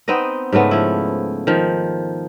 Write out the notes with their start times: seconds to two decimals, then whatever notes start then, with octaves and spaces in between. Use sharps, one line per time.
0.08 B3 C4 D#4 D#5
0.52 G#2 C#3 A3 B3
0.71 F3 E4
1.47 D#3 F3